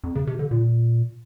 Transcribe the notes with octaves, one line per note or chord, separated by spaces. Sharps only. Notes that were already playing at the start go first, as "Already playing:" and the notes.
F2
C#3
C3
D3
A#2